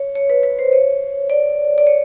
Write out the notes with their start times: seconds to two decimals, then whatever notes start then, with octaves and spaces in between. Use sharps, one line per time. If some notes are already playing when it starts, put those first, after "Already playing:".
Already playing: C#5
0.15 C#5
0.30 B4
0.43 B4
0.59 C5
0.73 C#5
1.30 D5
1.78 D5
1.87 C#5